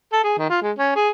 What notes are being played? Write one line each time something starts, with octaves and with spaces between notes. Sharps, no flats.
A4
G#4
D#3
F4
G#3
C#4
G#4